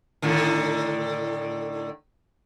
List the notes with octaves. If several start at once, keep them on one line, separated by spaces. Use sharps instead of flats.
A2 D3 D#3